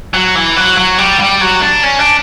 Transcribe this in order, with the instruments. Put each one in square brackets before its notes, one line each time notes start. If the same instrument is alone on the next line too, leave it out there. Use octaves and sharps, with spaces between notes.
[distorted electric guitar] F#3
E3
F#3
F#3
G3
G3
F#3
D4
C#4
D4